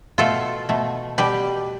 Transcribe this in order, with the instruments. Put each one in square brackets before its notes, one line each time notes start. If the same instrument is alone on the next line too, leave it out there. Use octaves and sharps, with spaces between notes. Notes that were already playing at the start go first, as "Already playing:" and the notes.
[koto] B2 A3 F4 A4
B2 A3
B2 G3 G4 B4